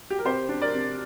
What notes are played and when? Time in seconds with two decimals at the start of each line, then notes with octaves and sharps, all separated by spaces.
0.10 G4
0.19 A#4
0.25 C3 G4 C5
0.49 D4
0.61 A#4 D5
0.73 C3